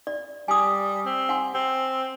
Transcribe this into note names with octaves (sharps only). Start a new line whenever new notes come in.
D5
G3 G#5 D#6
C4
F#5 G#5 C6
C4